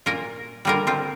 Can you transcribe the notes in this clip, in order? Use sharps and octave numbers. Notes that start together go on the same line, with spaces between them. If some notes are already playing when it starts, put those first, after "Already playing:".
A#2 A#3 F4 A#4
D3 G3 A#3 F4 A#4
C4 F4